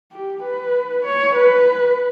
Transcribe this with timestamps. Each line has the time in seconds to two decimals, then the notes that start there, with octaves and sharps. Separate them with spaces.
0.12 G4
0.43 B4
1.05 C#5
1.35 B4